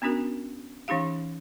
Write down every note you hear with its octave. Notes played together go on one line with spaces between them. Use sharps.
B3 C#4 D4 F#4 A#4
E3 C#4 D#4 G4 F5